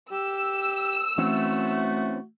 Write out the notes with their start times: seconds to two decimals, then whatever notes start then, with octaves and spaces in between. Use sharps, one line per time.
0.11 G4 E6
1.18 E3 A3 C4 C#4 F#4